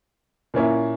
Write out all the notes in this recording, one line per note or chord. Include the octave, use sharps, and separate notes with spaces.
A#2 A#3 C#4 E4